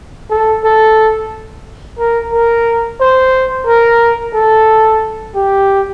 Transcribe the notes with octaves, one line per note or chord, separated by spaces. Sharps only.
A4
A4
A#4
A#4
C5
A#4
A4
G4